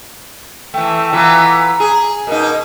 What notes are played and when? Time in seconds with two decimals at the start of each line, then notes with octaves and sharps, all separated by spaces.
0.74 E3 A3 G5
1.13 E3 B3 F4 A#5
1.80 G#4
2.27 B2 A#3 D#4 A#4